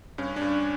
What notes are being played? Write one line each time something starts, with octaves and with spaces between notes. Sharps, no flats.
G2 C#4
D4
G2